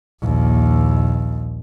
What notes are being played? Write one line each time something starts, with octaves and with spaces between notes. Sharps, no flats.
A#1 D#2